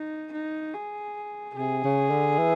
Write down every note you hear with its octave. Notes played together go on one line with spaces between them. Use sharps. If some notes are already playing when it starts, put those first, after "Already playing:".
Already playing: D#4
D#4
G#4
C3 G#4
C#3
D3
E3